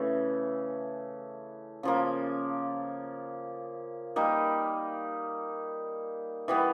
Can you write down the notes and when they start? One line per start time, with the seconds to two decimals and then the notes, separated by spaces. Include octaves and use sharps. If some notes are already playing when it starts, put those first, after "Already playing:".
Already playing: C#3 E3 A3
1.83 C#3 F3 A#3
4.16 G3 A#3 D#4
6.48 E3 G3 B3